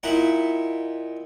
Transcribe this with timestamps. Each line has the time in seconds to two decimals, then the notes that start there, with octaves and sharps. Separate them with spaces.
0.03 A#2 D#4 E4 F#5